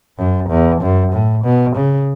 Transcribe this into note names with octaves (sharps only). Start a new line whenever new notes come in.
F#2
E2
F#2
A2
B2
C#3